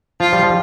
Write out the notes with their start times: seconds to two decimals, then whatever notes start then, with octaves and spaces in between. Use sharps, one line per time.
0.20 F3 F4
0.33 G3
0.43 F3